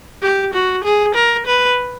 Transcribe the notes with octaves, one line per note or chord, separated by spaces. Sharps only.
G4
F#4
G#4
A#4
B4